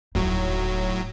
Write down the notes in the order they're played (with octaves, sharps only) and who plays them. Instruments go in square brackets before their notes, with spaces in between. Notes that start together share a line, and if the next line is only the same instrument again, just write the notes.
[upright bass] D#1 D#4 [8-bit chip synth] A2 F#3